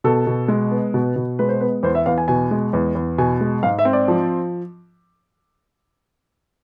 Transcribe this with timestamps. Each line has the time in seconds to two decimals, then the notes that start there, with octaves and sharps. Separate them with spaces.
0.04 B2 A4
0.27 B2
0.48 G#3
0.71 B3
0.94 B2
1.16 B2
1.39 G#3 B4
1.49 C5
1.60 B3 B4
1.83 E2 C5
1.95 E5
2.06 E2 F5
2.18 G#5
2.28 B2 G#5
2.51 G#3
2.73 E2
2.95 E2
3.18 B2 G#5
3.41 G#3
3.63 G#2 F5
3.79 E5
3.85 C4
3.93 D5
4.08 F3